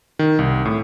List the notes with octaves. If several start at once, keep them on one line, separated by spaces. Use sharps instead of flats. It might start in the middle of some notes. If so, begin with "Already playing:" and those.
D#3
C2
A2